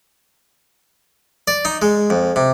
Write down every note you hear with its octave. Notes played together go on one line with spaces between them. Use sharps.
D5
D#4
G#3
F2
C3